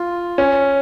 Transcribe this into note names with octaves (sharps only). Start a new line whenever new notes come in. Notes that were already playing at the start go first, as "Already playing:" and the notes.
Already playing: F4
C#4